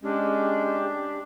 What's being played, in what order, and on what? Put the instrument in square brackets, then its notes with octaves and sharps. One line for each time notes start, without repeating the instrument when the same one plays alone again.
[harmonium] G#3 C#4 [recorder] D4 [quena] G4